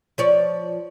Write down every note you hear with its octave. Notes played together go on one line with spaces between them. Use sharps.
F3 C#5 D5